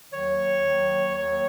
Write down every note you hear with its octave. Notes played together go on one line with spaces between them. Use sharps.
D#2 D#3 F#3 C#5
D#2 D#3 F#3
D#2 D#3 F#3 C#5